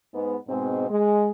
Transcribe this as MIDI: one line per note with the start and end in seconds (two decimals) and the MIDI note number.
0.13 0.36 44
0.13 0.36 59
0.48 0.89 44
0.48 0.89 47
0.48 0.89 56
0.48 0.89 60
0.90 1.31 56